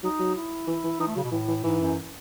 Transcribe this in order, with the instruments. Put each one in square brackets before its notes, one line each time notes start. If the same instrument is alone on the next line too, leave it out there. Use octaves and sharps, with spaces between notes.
[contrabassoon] F#3 [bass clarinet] D#4
[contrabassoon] F#3
[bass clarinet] E4
[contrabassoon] E3
E3
[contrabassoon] E3 [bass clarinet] D#4
[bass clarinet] A3
[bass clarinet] C#3 [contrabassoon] F#3
[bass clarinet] B2
[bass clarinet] A2 [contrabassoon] E3
[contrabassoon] E3
[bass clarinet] G#2 [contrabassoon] E3
[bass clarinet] F#2